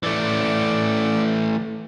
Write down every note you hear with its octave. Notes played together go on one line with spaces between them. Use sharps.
E3 A3 D5